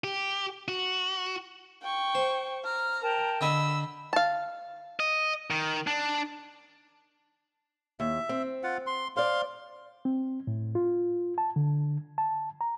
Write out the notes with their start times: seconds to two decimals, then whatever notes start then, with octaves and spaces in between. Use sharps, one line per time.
0.04 G4
0.68 F#4
1.82 G5 C#6
2.15 C5
2.64 A#5 F6
3.02 A#4 G5 A5
3.41 D3 D#5 G#5 B5 E6
4.13 F5 A5
5.00 D#5
5.50 D#3
5.87 D4
8.00 D#2 E5
8.29 C4
8.63 F4 F#5
8.87 C6
9.17 C5 D5 F5 C6
10.05 C4
10.47 A2
10.75 F4
11.38 A5
11.56 D3
12.18 A5
12.61 A#5